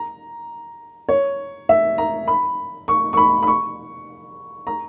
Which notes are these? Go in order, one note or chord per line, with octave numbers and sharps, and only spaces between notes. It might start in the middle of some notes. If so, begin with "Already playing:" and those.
Already playing: A#5
C#5
E5
A#5
B5
C#6
C#6
B5
B5
C#6
A#5